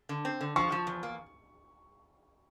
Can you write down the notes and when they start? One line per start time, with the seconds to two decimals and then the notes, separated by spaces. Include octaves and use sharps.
0.09 D3
0.25 C4
0.41 D3
0.56 F3 C#6
0.72 F3
0.87 E2
1.03 A#3